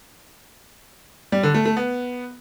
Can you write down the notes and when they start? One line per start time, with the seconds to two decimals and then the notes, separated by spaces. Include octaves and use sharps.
1.32 G3
1.43 D3
1.54 A3
1.65 A3
1.77 B3